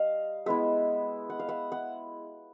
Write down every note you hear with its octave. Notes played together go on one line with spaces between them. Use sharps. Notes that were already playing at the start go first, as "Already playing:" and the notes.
Already playing: G3 D#5 F5
G#3 B3 E4 E5 F#5
F#5
F5
E5 F#5
F#5